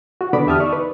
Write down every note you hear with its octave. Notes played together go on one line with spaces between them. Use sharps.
F#4
D3 B3 D4 B5 D6
E2 G4 E5 A5 D#6 F6
D#4 D5 C#6
B4